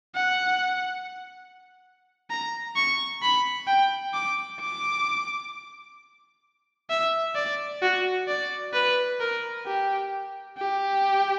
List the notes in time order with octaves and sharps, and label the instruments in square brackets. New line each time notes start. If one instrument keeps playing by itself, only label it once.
[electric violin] F#5
A#5
C#6
B5
G5
D6
D6
E5
D5
F#4
D5
B4
A#4
G4
G4